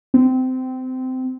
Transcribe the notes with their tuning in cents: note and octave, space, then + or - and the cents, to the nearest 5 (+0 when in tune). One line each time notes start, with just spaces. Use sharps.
C4 -25